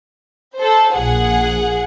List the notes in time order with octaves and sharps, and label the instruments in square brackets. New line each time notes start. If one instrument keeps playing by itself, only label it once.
[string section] A4 C5
A#1 G#4 F#5